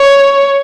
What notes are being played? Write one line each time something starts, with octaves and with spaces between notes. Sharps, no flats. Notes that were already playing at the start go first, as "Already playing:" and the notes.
Already playing: C#5